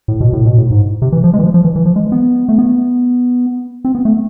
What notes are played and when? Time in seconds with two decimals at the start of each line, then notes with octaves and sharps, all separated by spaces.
0.08 A2
0.20 B2
0.33 A2
0.46 B2
0.58 A2
0.71 G#2
1.02 C3
1.12 E3
1.24 F3
1.34 G#3
1.39 E3
1.44 F3
1.54 F3
1.64 E3
1.76 E3
1.85 F3
1.96 G#3
2.12 B3
2.49 A3
2.58 B3
3.85 C4
3.95 B3
4.05 A3